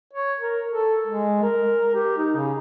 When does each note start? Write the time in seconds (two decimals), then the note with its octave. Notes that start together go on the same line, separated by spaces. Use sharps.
0.13 C#5
0.40 A#4
0.71 A4
1.07 G#3
1.42 A#4
1.94 G4
2.17 D#4
2.36 C#3